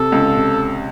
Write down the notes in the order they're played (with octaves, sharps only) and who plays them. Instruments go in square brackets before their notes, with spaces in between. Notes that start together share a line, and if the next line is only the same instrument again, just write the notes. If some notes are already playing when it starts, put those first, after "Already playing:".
Already playing: [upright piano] C3 [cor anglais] A4
[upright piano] C#2 C#3
C3